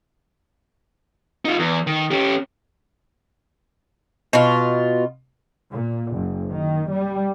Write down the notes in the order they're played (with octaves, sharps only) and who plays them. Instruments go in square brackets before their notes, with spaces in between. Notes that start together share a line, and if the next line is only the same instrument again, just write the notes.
[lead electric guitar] D#4 F4
E2
D#3
C#4 G4
[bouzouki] B2 F4
[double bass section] A#2
F#1
D#3
G3